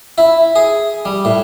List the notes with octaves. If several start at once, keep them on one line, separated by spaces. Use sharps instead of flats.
E4
G#4
G3
A2